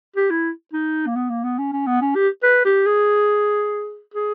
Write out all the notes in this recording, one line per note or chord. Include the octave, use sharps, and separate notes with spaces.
G4
E4
D#4
A#3
B3
A#3
B3
C#4
C#4
B3
C#4
G4
B4
G4
G#4
G#4